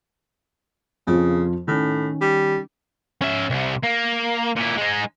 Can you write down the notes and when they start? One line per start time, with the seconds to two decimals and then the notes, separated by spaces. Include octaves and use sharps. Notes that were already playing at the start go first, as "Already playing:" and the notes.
1.07 F2 C#3 F3 F4
1.68 A2 D#3 C#4
2.21 G3
3.22 C#4 E5
3.50 C2 C3
3.83 A#3
4.56 A#2 E4
4.77 G#3 D#4